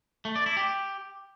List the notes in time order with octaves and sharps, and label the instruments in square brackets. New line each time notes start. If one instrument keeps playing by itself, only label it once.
[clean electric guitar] A3
D5
E4
G4